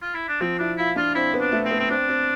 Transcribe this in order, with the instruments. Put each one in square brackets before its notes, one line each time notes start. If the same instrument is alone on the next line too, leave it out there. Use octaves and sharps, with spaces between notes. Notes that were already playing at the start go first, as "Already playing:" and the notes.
[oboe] F4
E4
D4
[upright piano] F3 [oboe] C4
[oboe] D4 [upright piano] E4
[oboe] E4 [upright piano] F4
[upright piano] D4 [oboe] F4
[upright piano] C4 [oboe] E4
[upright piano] B3
[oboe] D4
[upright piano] A3
[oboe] C4
[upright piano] B3
[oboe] C4
[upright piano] C4 [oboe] D4
[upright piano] C4